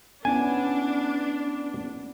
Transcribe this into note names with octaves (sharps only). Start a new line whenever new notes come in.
B3 C#4 D4 E4 G#5